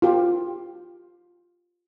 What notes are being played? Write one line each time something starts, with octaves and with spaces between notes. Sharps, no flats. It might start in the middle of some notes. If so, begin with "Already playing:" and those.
F4 G4